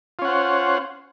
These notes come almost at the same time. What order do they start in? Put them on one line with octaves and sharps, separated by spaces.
F4 C#4 F#5 C5